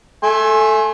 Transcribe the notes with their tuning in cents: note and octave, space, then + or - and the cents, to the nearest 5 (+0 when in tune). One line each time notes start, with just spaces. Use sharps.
A3 +0 G#5 +15 C6 +40